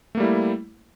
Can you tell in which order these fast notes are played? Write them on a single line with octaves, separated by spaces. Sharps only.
A3 A#3 G3 E4